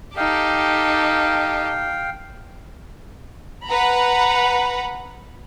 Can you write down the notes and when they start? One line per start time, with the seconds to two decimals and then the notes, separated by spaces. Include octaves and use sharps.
0.17 D#4 G4 A4 F5 G5
3.67 B4 F#5 A#5 B5